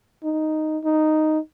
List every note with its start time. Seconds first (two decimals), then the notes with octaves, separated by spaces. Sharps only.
0.24 D#4
0.84 D#4